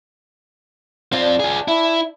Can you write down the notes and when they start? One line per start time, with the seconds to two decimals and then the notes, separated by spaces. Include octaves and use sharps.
1.12 C4 D4 F4
1.40 F4 G#4
1.68 E4